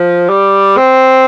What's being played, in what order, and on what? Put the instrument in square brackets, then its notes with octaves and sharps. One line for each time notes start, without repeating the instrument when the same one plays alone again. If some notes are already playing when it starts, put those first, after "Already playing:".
Already playing: [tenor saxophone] F3
G3
C4